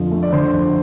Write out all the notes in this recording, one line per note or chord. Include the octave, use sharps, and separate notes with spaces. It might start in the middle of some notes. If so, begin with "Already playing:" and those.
Already playing: F2 D3 F3
A3
D5
D3 C5
F2